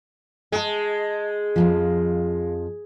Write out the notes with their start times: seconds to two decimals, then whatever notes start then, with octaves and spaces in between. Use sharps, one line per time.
0.52 G#3 G#5 A5
1.56 F2 G#2 F3